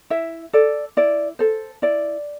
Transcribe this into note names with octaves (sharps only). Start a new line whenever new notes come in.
E4 E5
A4 D5
E4 D5
A4 C5
E4 D5